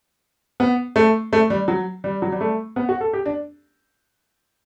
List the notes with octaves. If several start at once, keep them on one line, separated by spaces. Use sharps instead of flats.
B3
A3
A3
G3
F#3
G3
F#3
G3
A3
B3
F#4
A4
G4
D4